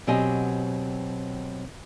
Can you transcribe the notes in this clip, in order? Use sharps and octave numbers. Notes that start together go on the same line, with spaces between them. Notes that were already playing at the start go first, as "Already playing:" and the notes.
B2 F#3 C4 G4 D#5 G#5